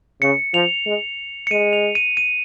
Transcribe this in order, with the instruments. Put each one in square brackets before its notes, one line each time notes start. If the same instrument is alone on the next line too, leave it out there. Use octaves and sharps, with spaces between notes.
[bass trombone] C#3 [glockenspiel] C#7
[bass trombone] F3 [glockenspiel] F7
[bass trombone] G#3
[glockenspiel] C#7
[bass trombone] G#3 [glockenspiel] D#7
[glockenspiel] F7
D#7
D#7